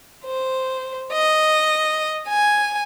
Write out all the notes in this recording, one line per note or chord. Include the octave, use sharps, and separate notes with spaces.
C5
D#5
G#5